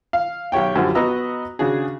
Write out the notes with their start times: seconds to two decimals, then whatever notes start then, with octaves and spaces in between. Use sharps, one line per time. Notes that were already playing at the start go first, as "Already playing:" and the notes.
0.13 F5
0.52 B1 G4 C#5 G5
0.76 F#2 D3 F3 G3
0.95 B3 F#4 B4 D#5 A#5 E6
1.59 C#3 D4 F#4 G#4